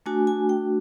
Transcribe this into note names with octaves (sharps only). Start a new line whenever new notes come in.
A3 D4 F#4 G#5
G#5
G5